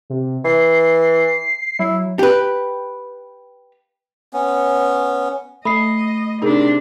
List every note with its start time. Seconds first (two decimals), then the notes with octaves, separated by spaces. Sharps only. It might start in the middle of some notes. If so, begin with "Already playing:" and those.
0.10 C3
0.45 E3 C7
1.79 F#3 E4
2.19 G4 B4
4.33 B3 C#4
5.65 A3 D#5 B5 D#6 C7
6.42 C3 D4 D#4 G#4 A#4